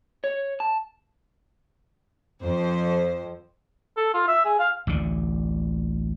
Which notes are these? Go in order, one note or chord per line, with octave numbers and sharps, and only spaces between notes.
C#5
A5
F2 C5
A4
F4
E5
G#4
F5
A1 D2 D3